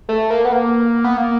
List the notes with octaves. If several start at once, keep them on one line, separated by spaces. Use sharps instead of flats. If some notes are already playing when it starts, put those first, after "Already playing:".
A3
A#3
B3
A#3
B3
A#3